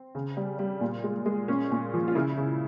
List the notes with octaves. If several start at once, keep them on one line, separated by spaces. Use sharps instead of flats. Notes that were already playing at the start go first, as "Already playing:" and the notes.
Already playing: C4
C#3
G3
G3
A#2
G#3
G#3
A#2 C#4
A#2
F3
F4
C#3 E4
C#3